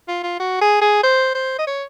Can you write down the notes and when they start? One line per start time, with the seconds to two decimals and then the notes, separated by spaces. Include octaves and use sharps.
0.08 F4
0.23 F4
0.40 F#4
0.61 G#4
0.81 G#4
1.03 C5
1.35 C5
1.59 D#5
1.67 C#5